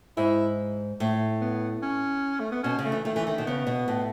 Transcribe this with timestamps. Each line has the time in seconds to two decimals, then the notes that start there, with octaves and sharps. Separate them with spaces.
0.17 G#2 E4
1.00 A2
1.41 B3
1.82 C#4
2.40 A3
2.52 B3
2.64 B2 C#4
2.79 C#3
2.85 A3
2.92 E3
3.05 D#3 A3
3.16 E3
3.27 D#3
3.38 B2
3.47 C#3 B3
3.67 B2
3.88 A2